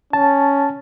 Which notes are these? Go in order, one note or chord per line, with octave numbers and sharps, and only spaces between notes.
C#4 A5